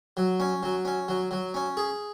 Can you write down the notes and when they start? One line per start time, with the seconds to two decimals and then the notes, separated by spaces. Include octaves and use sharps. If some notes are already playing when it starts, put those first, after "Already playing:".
0.17 F#3
0.40 C#4
0.63 F#3
0.85 C#4
1.08 F#3
1.31 F#3
1.54 C#4
1.77 G#4